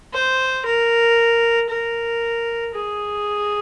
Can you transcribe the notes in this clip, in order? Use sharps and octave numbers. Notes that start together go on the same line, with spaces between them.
C5
A#4
A#4
G#4